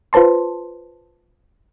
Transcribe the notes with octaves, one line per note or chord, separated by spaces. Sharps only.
F4 B4 C5 A5 C6